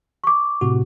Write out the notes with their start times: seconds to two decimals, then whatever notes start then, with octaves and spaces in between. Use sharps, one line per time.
0.24 C#6 D6
0.61 A2 C3 F#4